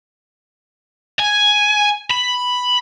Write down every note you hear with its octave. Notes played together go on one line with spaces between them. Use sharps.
G#5
B5